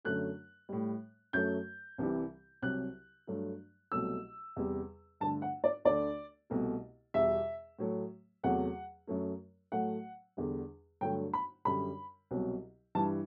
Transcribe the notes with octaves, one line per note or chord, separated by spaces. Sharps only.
F#2 D3 F#3 A3 F#6
A2 G3
F#2 F#3 A3 G6
C2 C3 E3 G3
C2 C3 F#3 F#6
G2 F#3 A3
C2 B2 F#3 A3 E6
E2 C3 G3
G2 D3 A3 A5
F#5
D5
D2 D3 A3 D5
C2 B2 A3
E2 B2 G3 E5
A2 F#3 A3
E2 C3 F#3 A3 F#5
F#2 F#3 A3
A2 F#3 A3 F#5
E2 D3 G3
G2 D3 F#3 A3 G5
B5
F#2 D3 G3 B5
C2 B2 F#3
G2 E3 G3 A5